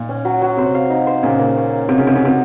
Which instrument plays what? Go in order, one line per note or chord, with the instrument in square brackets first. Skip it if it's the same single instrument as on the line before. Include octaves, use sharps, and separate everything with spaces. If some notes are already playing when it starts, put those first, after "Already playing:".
Already playing: [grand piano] A#2 [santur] D#4
[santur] C#4
F#3
F#3
[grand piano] C3 [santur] C5
[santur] F5
D#4
C5
[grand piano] A#2 C#3 [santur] A#3
[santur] A#3
C#4
A#3
[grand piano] C3 [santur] F#4
[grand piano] C#3
[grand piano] C3 [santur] D#4
[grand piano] C#3
[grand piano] C3 [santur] F#4